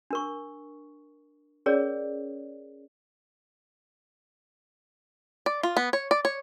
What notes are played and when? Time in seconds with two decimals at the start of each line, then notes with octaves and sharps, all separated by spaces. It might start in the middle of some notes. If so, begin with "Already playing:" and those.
0.11 D4 A#4 C#6
1.66 C#4 G#4 A#4 C#5 D5
5.46 D5
5.63 F4
5.77 B3
5.93 C#5
6.11 D5
6.25 C#5